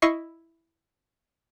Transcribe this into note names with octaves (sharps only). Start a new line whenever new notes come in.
E4 D#5 C#6 C7